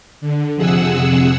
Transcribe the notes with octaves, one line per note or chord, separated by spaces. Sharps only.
D3
F2 C3 G#4 F#5 E6